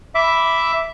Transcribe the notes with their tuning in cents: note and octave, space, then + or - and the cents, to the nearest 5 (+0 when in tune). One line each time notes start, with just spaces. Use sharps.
E5 +0 B5 +0 D6 -10